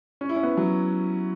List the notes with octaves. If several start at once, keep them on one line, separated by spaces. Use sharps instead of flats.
C#4
E4
C#4
B3
F#3